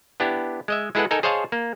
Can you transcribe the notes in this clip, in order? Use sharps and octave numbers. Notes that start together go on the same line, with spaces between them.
B3 D4 E4 G4
G#3 D#5 E5
G#3 E4 G#4 A4 B4 F#5
D#4 A4 A#4 G#5
G#4 C5 C#5 D#5 F5 A5
A#3